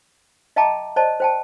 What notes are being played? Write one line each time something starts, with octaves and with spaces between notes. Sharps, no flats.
D#5 E5 G5 A5 A#5 D6
C5 D5 D#5 A5
C5 G5 A5